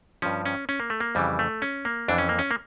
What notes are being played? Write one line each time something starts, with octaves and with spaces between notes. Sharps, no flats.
G2 F3 C#4
C#4
C#4
A#3
A3
A#3
F2 C#3 E3 G3
A3
C#4
A#3
F2 E3 D4
C#4
A#3
C#4
A#3